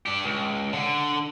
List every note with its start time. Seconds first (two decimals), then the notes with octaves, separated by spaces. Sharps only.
0.06 D4 G4
0.24 C#2
0.73 D3